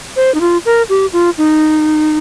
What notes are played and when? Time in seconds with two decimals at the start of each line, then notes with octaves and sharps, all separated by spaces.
0.16 C5
0.35 D#4
0.41 F4
0.65 A#4
0.89 G4
1.13 F4
1.38 D#4